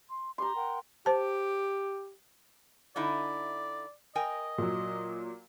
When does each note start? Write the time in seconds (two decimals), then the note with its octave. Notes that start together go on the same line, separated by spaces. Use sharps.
0.08 C6
0.38 G4 A#5 C6 D6
0.55 A#4 F#5 G5
1.06 G4 C5 A5
2.96 D3 D#4 E4 D5
4.15 A#4 D#5 G5 G#5
4.58 A#2 F#3